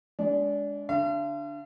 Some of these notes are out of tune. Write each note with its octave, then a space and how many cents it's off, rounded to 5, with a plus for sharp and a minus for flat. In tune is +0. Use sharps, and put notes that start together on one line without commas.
G#3 +0 D4 -25
D3 +0 F5 -45